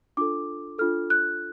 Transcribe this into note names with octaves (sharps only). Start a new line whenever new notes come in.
D4 F4 A4 D6
D4 F4 A4 F6
F#6